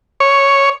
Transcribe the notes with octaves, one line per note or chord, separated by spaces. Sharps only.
C#5